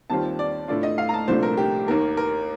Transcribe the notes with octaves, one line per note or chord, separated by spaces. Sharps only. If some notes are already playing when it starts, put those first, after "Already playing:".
D#2 D#3 G3 C4 F4 A5
D5
A2 A3 D4 F4 D5
D#5
F5
A#5
A5
C2 A#2 F3 A3 D4 C5
A#4
G4
D#2 D#3 A#3 A#4
A#4